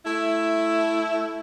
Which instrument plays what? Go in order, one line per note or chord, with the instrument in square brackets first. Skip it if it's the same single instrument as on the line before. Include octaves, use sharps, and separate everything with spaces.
[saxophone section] A3 E4